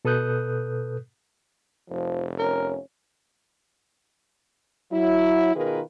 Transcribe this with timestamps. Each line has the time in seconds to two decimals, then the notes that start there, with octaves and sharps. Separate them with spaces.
0.05 B2 A4 B4 D#6 F#6 G6
1.90 F1 F3
2.39 C#4 A#4
4.92 F#3 E4
5.56 B2 D#3 F4 G#4 A#4 B4